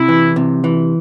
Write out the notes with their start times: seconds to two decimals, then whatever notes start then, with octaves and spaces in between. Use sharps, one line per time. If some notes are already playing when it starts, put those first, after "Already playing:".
Already playing: C3 E4
0.09 E3
0.36 C3
0.64 E3